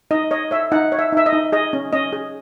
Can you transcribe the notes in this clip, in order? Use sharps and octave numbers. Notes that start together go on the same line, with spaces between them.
D#4 D#5
C#5 D#5
C#5 E5
D#4 F#5
C#5
E5
D#4 E5
D#5
D#4
G#4 D#5
C#4
C#4 D#5
G#4